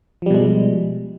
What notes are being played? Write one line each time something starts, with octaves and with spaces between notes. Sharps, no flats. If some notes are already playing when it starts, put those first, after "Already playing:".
B2 F3 G3 G#3